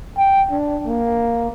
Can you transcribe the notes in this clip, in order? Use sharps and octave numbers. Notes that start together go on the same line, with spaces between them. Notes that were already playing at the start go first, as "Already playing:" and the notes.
G5
D4
A#3